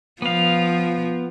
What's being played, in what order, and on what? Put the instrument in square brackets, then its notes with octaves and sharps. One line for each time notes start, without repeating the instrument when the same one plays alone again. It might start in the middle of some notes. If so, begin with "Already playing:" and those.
[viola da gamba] F3 [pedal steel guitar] B3 F5